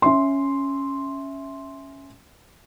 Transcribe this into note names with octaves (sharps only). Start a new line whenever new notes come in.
C#4 E5 C6